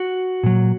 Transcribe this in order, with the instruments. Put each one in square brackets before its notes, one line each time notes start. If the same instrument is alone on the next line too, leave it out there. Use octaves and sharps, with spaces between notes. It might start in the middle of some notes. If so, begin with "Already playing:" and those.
Already playing: [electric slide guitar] F#4
A#2 F#3